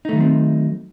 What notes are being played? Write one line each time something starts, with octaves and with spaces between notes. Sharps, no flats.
D#3 F#3 A3 C4 D#4